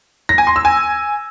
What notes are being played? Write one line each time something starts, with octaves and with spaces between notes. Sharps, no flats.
A#6
G#5
C6
E6
G#5